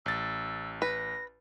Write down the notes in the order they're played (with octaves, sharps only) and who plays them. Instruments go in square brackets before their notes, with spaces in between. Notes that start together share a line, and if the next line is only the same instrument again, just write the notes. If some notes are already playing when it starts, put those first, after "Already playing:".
[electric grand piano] A1 A6 [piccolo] E6
[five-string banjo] B4 [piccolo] A#6